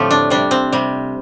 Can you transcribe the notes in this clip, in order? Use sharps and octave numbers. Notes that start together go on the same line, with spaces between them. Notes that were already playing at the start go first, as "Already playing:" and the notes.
Already playing: A2 D3 F3 A3 C4 F4 G4
D4
C3 G3 D4
C4
C3 G3